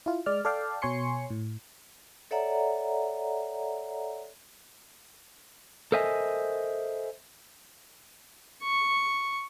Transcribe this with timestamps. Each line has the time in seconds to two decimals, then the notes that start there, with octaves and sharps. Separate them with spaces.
0.06 E4 F4
0.26 G#3 D5 F6
0.45 A4 D5 F5 G5
0.82 B2 C#5 G#5 C6 C#7
1.30 A2
2.31 A4 C#5 D5 E5 F#5 A#5
5.92 A4 A#4 C5 D#5 E5 G#5
8.63 C#6